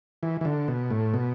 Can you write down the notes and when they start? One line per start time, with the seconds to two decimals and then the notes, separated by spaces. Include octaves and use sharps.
0.23 E3
0.41 E3
0.45 D3
0.68 B2
0.91 A2
1.14 B2